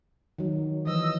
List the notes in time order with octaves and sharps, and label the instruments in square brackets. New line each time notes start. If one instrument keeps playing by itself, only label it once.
[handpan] D#3 F#3
[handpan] E3 F3 [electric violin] D#5 E6